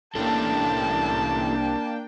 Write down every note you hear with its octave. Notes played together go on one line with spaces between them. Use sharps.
C2 A#3 C#4 D4 E4 A4 G5 A5